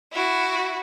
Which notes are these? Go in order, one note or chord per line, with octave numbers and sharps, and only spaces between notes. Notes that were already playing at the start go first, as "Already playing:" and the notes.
E4 F#4